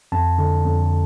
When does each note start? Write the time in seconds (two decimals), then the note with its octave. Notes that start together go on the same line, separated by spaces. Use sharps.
0.12 F2 A5
0.38 D3
0.65 F2